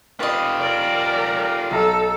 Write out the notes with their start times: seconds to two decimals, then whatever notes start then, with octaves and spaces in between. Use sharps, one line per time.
0.20 F4 G4 B4 D#5
0.60 A#4 D5
1.71 B1 A4 A#5 E6